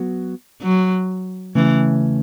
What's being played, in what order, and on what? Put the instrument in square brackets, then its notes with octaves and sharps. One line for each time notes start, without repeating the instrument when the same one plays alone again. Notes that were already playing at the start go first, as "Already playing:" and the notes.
Already playing: [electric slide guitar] F#3 B3 F#4
[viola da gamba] F#3
[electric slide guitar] C#3 A3 C#4 [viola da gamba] E3